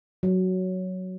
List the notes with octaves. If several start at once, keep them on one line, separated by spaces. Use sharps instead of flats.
F#3